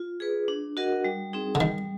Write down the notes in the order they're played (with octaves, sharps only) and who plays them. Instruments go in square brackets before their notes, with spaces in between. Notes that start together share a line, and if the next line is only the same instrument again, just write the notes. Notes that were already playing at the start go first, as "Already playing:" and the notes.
Already playing: [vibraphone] F4
G#4 B4
D4
F#4 A#4 D#5 F#5
G3
C4 D#4 G#4
[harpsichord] D3
[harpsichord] D#3 [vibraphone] G3